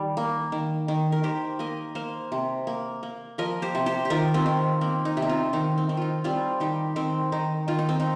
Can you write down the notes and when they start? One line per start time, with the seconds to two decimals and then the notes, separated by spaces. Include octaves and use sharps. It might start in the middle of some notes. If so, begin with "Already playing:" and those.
Already playing: D#3 G3
0.17 A#3
0.52 D#3
0.88 D#3
1.12 A#4
1.23 D#3 G4 C5
1.59 A#3 A#4 D#5
1.95 A#3 C5 F5
2.32 C3
2.67 A#3
3.03 A#3
3.38 F3 A#4 D#5
3.62 G4 C5
3.75 C3
3.86 G4 C5
4.05 G4
4.10 D#3 F4 A#4
4.34 C4 F4
4.46 D#3
4.81 A#3 C4
5.05 D#4
5.17 C3
5.22 D#4
5.29 C4 F4
5.53 D#3 D#4
5.78 C4
5.89 D#3
5.97 D#4 F4
6.24 G3 C4 F4
6.60 D#3 D#4 G4
6.96 D#3 C4
7.32 D#3 D#4
7.68 D#3 F4
7.79 D#4
7.89 C4
8.00 D#4